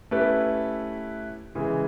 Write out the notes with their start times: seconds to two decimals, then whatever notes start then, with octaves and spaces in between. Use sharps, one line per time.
0.11 A3 C#4 E4 G4 B4
1.55 C#3 E3 G#3